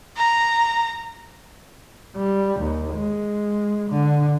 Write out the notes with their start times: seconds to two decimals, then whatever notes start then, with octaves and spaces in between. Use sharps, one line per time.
0.17 A#5
2.16 G3
2.60 D#2
2.93 G#3
3.90 D3